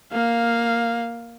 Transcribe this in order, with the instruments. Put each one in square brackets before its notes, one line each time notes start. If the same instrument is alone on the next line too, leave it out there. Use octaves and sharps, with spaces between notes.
[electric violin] A#3 F5